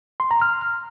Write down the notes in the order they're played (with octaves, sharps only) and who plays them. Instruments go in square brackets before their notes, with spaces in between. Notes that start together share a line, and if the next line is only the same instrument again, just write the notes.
[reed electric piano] C6
A#5
F6